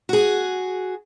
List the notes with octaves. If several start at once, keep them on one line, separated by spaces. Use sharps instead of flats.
F#4 G#4